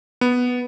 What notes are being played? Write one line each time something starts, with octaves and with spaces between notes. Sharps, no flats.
B3